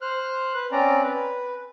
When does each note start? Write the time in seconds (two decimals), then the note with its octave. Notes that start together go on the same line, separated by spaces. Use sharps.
0.02 C5 F6 F#6
0.54 B4 F#6
0.72 C4 C#4 D5 A#5
1.03 B4